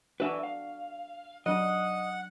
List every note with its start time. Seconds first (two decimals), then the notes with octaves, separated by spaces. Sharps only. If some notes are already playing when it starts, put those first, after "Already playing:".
0.20 D4 F#4 B4 E5
0.43 F5
1.46 F#3 D4 D#5 F#5